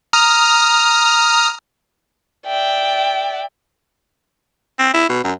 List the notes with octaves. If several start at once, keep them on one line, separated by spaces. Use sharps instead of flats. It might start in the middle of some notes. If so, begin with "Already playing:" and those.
A#5 D#6 F6
D5 E5 G5
C4
E4
B2
F#2